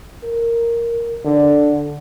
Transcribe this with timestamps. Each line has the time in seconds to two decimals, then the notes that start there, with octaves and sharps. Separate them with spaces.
0.24 A#4
1.25 D3